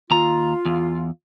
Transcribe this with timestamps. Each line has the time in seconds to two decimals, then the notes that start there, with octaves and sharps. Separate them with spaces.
0.11 D#2 F4 A#5
0.65 E2